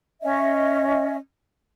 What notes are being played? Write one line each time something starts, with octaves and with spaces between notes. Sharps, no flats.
C#4 D#5 E5